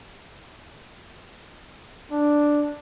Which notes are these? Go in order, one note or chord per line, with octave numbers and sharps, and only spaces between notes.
D4